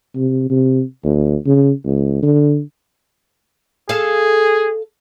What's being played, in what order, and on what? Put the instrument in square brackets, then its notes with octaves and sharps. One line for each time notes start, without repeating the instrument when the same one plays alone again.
[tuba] C3
C3
D2
C#3
C#2
D3
[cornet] G#4 [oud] A4 F5